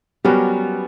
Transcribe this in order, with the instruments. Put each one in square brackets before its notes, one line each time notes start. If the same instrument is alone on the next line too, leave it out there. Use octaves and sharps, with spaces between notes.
[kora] F#3 C#4 G4 A#4 [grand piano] G3 B3